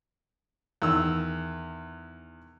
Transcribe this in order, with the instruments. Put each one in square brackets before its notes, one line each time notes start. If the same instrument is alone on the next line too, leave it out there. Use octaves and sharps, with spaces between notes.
[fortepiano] E2 D#3 E6